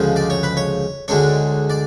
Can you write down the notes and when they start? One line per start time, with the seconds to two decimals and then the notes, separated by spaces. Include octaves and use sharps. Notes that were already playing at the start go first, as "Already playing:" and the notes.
Already playing: D2 C#3 F3 G#3
0.16 D5
0.30 C#5
0.43 B4
0.57 C#5
1.08 D2 D3 G#3 D4 C#5
1.70 D5